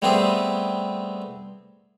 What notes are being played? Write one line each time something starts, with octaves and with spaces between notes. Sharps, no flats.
G3 A3 B3 C4 G4 G#4